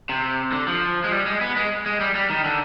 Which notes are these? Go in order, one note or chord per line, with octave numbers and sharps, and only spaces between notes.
C3
D3
F3
G#3
G3
G#3
B3
G#3
G#3
G3
G3
D#3
D3